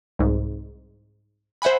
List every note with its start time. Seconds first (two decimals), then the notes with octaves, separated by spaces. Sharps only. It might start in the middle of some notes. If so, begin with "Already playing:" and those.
0.19 C2 G#2
1.62 C5 E5 F#5 G#5 B5